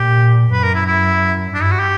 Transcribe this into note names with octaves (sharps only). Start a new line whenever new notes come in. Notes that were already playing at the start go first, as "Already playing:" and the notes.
Already playing: A#2 G4
F#2 B4
A#4
E4
E4
G2 D4
E4
F#4
G4